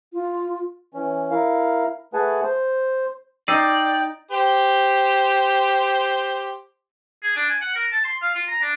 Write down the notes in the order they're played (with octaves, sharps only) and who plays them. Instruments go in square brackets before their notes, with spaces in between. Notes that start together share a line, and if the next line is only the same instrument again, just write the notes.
[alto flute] F4
[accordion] E3 C#4
E4 A#4 F5
A3 G#4 B4 F#5 G#5 A5
C5
[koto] D#4 [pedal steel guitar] D5 [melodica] G5 [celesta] E6 C7 D#7
[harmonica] G4 C5
[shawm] G#4
D4
G#5
F#5
A#4
A5
C6
F5
F4
A#5
D4